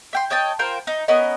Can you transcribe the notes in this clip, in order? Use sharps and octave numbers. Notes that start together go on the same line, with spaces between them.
E5 G5 C6
C#5 D#5 G5 A5
F4 A#4 C5 G5
D#4
B3 C#4 A#4 D#5